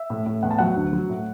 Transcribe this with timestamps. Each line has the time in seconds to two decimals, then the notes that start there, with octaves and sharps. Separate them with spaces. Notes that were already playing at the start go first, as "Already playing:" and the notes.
Already playing: E5
0.10 A2
0.26 A2
0.43 E2 F#5
0.51 A5
0.59 F#3 F#5
0.76 D2
0.93 F#3
1.09 A2